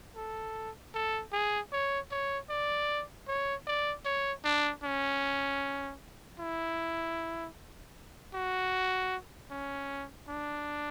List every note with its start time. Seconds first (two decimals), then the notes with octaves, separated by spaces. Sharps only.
0.16 A4
0.94 A4
1.33 G#4
1.72 C#5
2.11 C#5
2.49 D5
3.28 C#5
3.67 D5
4.05 C#5
4.45 D4
4.84 C#4
6.39 E4
8.34 F#4
9.51 C#4
10.29 D4